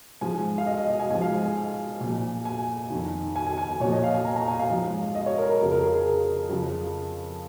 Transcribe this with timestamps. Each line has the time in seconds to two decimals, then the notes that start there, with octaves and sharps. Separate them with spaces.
0.21 G#2 F3 G#5
0.58 F5
0.66 D#5
0.77 D#5
0.89 D#5
0.99 G#5
1.11 G#2 F3 G#5
1.22 F5
1.32 G#5
2.00 A#2 F3
2.45 G#5
2.90 F2 D#3
3.36 G#5
3.47 G#5
3.58 G#5
3.80 A#2 F3 C#5
3.92 D#5
4.04 F5
4.14 G#5
4.25 A#5
4.36 A#5
4.48 G#5
4.59 F5
4.70 G#2 F3
5.15 D#5
5.26 C#5
5.38 A#4
5.49 A#4
5.61 F2 C#3 F3
5.71 A#4
5.83 G#4
5.94 A#4
6.05 G#4
6.49 F2 C#3 F3